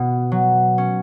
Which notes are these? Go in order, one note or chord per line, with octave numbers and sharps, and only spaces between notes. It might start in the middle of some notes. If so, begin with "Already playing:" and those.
Already playing: B2 B3
F#3
C#4